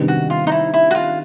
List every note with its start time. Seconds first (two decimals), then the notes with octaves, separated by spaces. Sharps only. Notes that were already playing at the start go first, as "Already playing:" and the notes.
Already playing: C3 D#3 G3 B3 D4
0.08 F#4
0.30 F4
0.47 D#4
0.52 E4
0.74 E4
0.91 F#4
0.95 F4